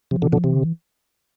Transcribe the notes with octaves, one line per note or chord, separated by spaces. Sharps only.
C3 F3
B2 D3 E3
B2 D3 F3
C3 E3
D3
E3